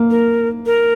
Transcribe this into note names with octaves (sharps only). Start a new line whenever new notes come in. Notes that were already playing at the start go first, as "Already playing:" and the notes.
Already playing: A#3
A#4
A#4